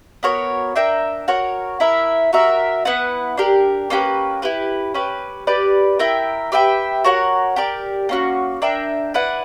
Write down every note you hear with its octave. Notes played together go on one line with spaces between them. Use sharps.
B3 F#4 A#4 C#5
D4 A#4 E5 G5
F#4 A#4 C#5
E4 A#4 E5
F#4 A#4 E5
B3 E4 B4 F#5
D4 G4 A#4
A#3 C#4 G4 B4
E4 G4 B4
C#4 G4 B4
G4 B4 D5
E4 A#4 E5 G5
G4 B4 E5 G5
F#4 A#4 C#5 F#5
G4 A#4 D5
A#3 C#4 F#4
D4 A#4 E5 G5
E4 B4 D5 F#5